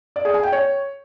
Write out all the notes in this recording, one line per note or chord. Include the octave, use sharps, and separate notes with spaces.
D5
G#4
G#5
G5
C#5